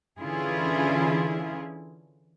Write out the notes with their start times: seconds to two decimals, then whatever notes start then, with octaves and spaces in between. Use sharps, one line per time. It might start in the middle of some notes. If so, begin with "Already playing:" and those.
0.19 D3 E3 C#4 E4 F4 G#4